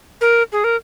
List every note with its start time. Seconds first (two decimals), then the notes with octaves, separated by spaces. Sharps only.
0.21 A#4
0.52 G#4
0.64 A#4